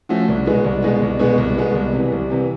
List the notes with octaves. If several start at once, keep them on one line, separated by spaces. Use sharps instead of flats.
F3 A3 C#4 F#4
C2
B2 G#3 B3
C2
B2 G#3 B3
C2
B2 G#3 B3
C2
B2 G#3 B3
C2
C3 E3
C2
C3 E3